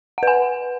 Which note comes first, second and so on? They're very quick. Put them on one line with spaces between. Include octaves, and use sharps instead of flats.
F#5 B4 G#5